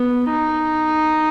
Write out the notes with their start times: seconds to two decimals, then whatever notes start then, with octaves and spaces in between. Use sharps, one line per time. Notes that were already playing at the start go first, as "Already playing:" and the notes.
Already playing: B3
0.30 D#4